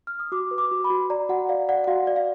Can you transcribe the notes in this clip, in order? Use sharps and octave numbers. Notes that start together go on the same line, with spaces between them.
F6
D#6
F#4 D6
B4
D6
F#4
B5
F#4
D5 A#5
F#4 F#5
D5 F5
D5 F#5
F#5
F#4 F5
D5
F5